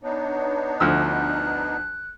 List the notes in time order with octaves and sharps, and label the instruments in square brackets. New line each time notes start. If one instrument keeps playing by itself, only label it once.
[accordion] B3 D4 D#4 [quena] C#5
[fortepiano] D2 F3 E6 [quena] F#6